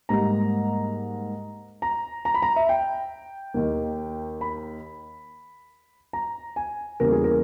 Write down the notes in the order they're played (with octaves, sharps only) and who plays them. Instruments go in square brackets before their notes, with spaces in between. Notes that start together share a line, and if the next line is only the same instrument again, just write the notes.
[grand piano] G#2 G3 A#3 A#5
A#5
A#5
B5
A#5
E5
G5
D#2 D#3 A#3
B5
A#5
G#5
E2 C#3 G3 A#3 A#4
G#4
A#4